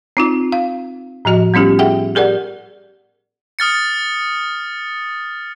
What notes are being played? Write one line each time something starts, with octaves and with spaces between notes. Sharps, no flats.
C4 D#4 F4
F5
A2 F3 F#4 D#5
G3 B3 C#4 F4 G4
G#4 E5 F#5 G5
G4 G#4 A#4 D5 F#5
D#6 F6 A6 C#7